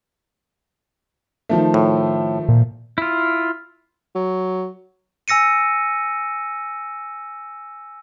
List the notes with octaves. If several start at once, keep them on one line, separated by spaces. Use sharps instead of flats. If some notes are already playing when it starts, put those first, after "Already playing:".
D#3 F3 A3
A2
A#2
E4 F4
F#3
G#5 E6 A#6 C#7 D#7